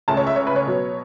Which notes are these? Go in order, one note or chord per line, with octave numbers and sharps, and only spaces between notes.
C#2 C#3 A3 C#4 A5
C#5
E5
C#5
B4
C#5
B2 F#3 B3